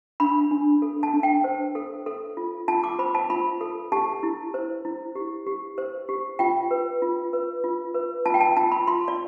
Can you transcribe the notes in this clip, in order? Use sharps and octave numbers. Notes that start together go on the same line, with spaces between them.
D4 B5
D4
A4
A5
D4
G5
C5
A4
A4
F4
F4 A5
D6
C5 B5
A5
F4 B5
A4
G4 A5
E4
C5
E4
G4
G4
C5
G4
F4 G5
B4
F4
B4
F4
B4
F4 A5
G5
A5
F4 A5
B5
F4 C6
D5